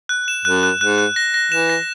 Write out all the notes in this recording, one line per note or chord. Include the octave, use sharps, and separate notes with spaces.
F#6
E7
F#2 F#6
F#6
G#2 F#6
F#6
A#6
A#6
E3 E7
A#6